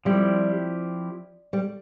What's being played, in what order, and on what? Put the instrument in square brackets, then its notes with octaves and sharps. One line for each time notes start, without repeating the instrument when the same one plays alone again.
[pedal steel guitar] F3 C4 E4 G4 [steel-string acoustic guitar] G3
[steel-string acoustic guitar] G3